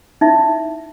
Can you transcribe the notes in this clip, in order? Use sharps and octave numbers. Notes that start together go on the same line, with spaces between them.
D#4 E4 E5